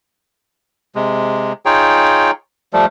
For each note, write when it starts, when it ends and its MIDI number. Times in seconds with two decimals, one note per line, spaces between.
0.95 1.53 48
0.95 1.53 56
1.66 2.31 63
1.66 2.31 65
1.66 2.31 68
1.66 2.31 73
1.66 2.31 79
2.73 2.86 53
2.73 2.86 55
2.73 2.86 57